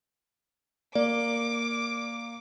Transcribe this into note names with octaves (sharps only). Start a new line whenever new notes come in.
A#3 D5 D6